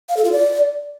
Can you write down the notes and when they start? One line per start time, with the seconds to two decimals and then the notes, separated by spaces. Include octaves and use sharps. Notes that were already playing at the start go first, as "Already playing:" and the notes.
0.09 F5
0.17 A4
0.24 F4
0.32 D5